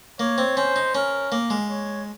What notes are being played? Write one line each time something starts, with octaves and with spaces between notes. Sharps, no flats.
A#3 C#5
C4
C#4 C5
D#4
C#4 A#4
A#3
G#3
C#5